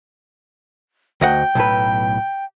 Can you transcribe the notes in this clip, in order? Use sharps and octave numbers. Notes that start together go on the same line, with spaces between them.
D2 D#5 F#5 G5
B1 A2 B4